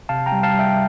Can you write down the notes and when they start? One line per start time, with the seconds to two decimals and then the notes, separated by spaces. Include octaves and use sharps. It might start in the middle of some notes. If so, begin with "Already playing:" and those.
0.09 C3 F5 A5
0.26 G5 A#5
0.32 G3
0.43 F5 A5
0.53 G3
0.59 E5 G5